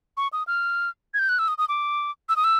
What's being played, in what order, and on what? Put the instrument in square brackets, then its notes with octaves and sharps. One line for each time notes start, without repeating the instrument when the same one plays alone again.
[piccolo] C#6
D#6
F6
G#6
G6
F#6
E6
D#6
D#6
D6
E6
D#6
E6